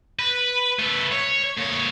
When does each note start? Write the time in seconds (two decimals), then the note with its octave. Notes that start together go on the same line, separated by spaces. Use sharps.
0.19 B4
0.80 A3 B3
1.12 C#5
1.57 A#2 C#5